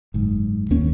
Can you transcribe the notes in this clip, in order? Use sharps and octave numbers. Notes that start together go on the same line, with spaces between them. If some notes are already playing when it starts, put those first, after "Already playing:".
F#1 G#2
D#2 A#3 C#4